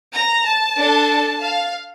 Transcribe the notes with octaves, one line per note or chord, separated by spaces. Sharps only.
A#5
A5
D4 A4
F5